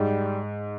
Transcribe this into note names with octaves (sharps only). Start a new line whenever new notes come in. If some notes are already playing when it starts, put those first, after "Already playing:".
Already playing: G#2 G3